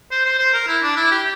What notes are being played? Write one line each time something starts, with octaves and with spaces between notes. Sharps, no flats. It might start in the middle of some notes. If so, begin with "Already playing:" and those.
C5
C5
C5
A#4
E4
D4
E4
G4